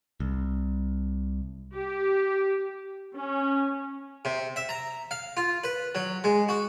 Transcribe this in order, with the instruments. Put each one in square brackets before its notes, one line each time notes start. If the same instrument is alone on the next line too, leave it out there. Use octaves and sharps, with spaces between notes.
[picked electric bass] C2
[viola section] G4
C#4
[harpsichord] C3
E5
A#5
F5
F4
B4
F#3
G#3
F#4